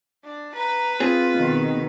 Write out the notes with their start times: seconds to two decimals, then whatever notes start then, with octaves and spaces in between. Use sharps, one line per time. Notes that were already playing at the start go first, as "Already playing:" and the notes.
0.24 D4
0.55 B4 A#5
1.00 C4 F4 G#4
1.36 B2 D#3